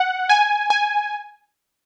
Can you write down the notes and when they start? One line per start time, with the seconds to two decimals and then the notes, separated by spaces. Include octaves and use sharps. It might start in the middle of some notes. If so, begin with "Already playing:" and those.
Already playing: F#5
0.29 G#5
0.70 G#5